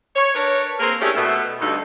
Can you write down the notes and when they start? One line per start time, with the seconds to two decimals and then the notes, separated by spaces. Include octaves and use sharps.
0.14 C#5
0.34 D4 A#4 B4 C#5
0.79 A#3 C4 G#4 A#4
1.00 A3 C#4 D4 E4 G4 G#4
1.15 B2 A3
1.60 D2 G2 B2 D3 D#4 A4